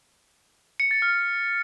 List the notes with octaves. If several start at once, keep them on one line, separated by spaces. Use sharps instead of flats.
C#7
A6
F6